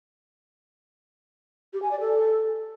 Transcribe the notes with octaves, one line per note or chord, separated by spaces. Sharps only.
G4
G#5
D5
A4